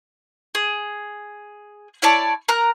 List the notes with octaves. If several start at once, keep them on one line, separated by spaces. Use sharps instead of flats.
G#4
E4 C#5 D5 A5
A#4 A#5 F#6